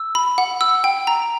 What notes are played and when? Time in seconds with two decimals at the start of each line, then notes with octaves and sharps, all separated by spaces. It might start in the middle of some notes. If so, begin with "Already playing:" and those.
Already playing: E6
0.15 B5
0.38 F#5
0.61 E6
0.84 G5
1.07 A#5